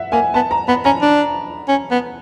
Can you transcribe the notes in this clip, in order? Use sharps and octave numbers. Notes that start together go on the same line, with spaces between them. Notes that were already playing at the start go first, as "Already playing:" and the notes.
Already playing: E5 F#5
A#3 G#5
B3 A5
A#5
B3 B5
C#4 A#5
D4
C#4
B3